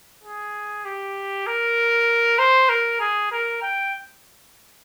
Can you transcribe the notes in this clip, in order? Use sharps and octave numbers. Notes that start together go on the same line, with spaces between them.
G#4
G4
A#4
C5
A#4
G#4
A#4
G5